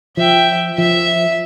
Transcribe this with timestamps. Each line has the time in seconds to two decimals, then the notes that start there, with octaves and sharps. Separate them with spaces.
0.17 F3 E5 G5
0.78 F3 E5